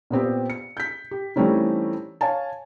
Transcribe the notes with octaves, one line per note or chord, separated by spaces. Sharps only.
A#2 B3 C4 G4
C#7
G6 B6
G4
E3 G3 A3 C4 C#4 D#4
C#5 F5 G#5 A5